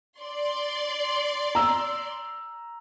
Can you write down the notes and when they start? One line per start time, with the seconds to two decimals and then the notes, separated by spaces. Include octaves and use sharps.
0.20 D5 C6
1.55 A#5 E6